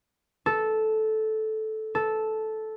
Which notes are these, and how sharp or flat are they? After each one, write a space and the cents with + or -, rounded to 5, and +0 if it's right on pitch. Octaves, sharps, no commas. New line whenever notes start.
A4 -10
A4 -10